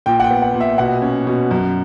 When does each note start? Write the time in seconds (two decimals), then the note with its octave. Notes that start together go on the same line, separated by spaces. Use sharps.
0.06 A#2 G5
0.20 F#5
0.24 G5
0.31 B3
0.42 F#5
0.54 A#2
0.60 E5
0.78 B2 F#5
1.02 C#4
1.27 B2
1.51 F#2